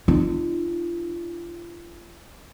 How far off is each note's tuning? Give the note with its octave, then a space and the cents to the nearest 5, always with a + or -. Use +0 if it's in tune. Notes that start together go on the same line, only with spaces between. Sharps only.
D4 +35 F4 -35